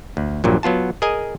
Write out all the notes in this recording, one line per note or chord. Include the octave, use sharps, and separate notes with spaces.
D2
A#1 G2 A#2 F#3
F#3 B3 F4 A5
G#4 A#4 D#5 G#5